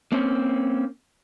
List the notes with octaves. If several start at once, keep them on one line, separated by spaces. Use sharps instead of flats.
A#3 C4 C#4